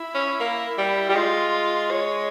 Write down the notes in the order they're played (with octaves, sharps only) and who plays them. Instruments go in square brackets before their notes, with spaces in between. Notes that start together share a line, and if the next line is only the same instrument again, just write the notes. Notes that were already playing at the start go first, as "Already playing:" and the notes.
Already playing: [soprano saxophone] E4
[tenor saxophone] C#4
A#3
G3
[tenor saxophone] G3 [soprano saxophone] G4
[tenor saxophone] G#3 [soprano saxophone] F4
[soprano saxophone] C#5